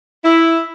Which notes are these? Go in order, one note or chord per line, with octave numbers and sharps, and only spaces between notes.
E4